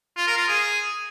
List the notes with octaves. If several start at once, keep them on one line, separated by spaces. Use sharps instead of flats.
F4
A#4
F4
G#4